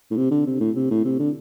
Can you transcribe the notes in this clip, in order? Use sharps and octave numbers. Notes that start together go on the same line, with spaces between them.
A2
C3
D3
C3
A2
C3
A2
C3
D3